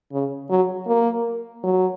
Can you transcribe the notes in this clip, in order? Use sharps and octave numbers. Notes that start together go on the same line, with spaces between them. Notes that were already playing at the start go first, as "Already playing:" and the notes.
C#3
F#3
A#3
F#3